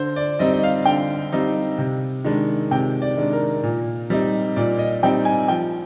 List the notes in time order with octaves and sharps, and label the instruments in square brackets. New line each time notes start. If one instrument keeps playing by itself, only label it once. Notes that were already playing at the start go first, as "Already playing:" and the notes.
Already playing: [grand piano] D3 C5
D5
G3 C4 D#4 D#5
D#5
F5
D3 G5
G3 C4 D#4
C3
D#3 G#3 D4
C3 G5
D5
D#3 G#3 D4
A#4
A#2
G3 C4 D#4
A#2 D5
D#5
G3 C4 D#4 G5
G#5
F3 G5